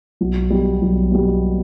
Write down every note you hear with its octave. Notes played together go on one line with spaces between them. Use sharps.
B1
B2 G3
B1
B2 G3